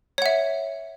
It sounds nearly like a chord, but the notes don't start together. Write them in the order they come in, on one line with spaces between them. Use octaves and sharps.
C#5 F#5 E5